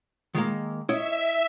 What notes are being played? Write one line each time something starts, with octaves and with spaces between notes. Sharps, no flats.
D#3 G#3 A#3
E4 C#5 D#5 E5